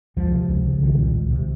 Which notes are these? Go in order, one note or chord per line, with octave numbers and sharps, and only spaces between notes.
C#2 F3
C3
C#2
C#3
C2 D#3
A#2
C#2
C3